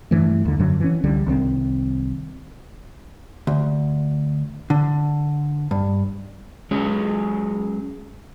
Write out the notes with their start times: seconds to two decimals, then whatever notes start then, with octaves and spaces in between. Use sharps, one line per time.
0.11 G2 E3 A3
0.45 D#2 D3
0.59 F#2 D3 F#3
0.80 E3 C#4
1.04 C#2 D3 G3
1.26 C2 D#3 F#3 C4
3.47 D2
4.70 D3
5.71 G2
6.71 F#3 G#3 C#4 G#4 C#5